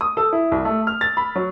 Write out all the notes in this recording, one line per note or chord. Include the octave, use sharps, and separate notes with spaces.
D#6
A4
E4
C2
A3
F6
A6
B5
F#3